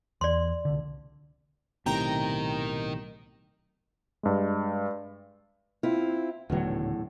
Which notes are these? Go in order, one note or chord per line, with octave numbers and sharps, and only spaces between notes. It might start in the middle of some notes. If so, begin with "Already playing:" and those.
E2 D5 C6
C2 D3
B1 A2 C3 D#3 A#4 G5 A#5
G2 G#3
C4 E4 F4
D#1 E2 A2 D3 F#3